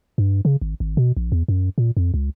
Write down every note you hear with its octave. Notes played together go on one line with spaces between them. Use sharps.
G2
C#3
G#1
G#1
B2
A#1
E2
F#2
A#2
F2
C#2